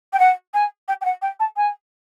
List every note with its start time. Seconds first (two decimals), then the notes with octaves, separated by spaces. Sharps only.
0.13 G5
0.19 F#5
0.54 G#5
0.88 G5
1.01 G5
1.05 F#5
1.22 G5
1.40 A5
1.57 G#5